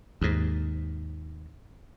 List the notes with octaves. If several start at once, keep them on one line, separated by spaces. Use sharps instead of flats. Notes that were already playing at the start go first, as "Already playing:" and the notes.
D#2 G#2